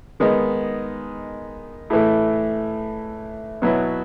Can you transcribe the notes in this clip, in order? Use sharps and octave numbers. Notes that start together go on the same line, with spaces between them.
D#3 G#3 B3 D#4
A2 E3 A3
B2 F#3 B3 E4